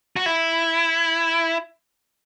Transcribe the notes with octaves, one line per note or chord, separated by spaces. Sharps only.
F#4
E4